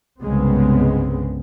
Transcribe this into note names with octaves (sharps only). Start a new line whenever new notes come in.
C2 G2 C#3 G#3 B3 C4